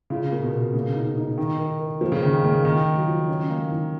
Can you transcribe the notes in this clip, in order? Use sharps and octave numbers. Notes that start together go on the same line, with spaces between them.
C#3 F4
A#2 A#4
B2
A#4
C#3 A#3
D#4
D#4
D#3 D#4
A#4
A#4
F3 A#3
C#3
D#3 A#3
C#3 A#3
D#3 A#3
A#3
F#3
F3
C#4
A#3
D#3